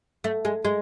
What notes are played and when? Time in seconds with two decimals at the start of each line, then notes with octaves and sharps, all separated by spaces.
0.24 A3
0.45 G#3
0.65 G#3